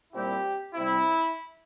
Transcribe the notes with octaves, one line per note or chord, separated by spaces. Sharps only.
A#2 G3 C4 E4 G4
C3 G3 C4 E4